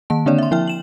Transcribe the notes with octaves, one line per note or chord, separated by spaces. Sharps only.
D#3 A#3 A5
D3 A#3 C4 D4 C#5 D5
E5 C6
F3 E4 E5 G5 F6
E7 F#7